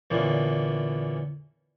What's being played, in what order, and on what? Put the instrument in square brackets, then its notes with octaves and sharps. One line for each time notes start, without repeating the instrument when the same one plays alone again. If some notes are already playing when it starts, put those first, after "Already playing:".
[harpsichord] E2 A#2 D3 E3 C#4